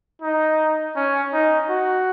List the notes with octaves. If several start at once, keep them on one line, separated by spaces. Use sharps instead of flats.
D#4
C#4
D#4
F#4